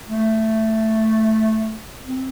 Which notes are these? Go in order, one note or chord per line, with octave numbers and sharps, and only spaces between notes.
A3
C4